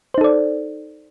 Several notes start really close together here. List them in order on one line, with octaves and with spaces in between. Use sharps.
C5 D#4 A4 D5